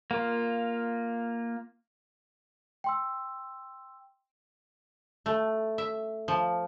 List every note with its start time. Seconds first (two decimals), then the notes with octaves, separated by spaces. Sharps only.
0.11 A#3 F4
2.84 G5 C6 E6
5.26 A3
5.78 E5
6.28 F3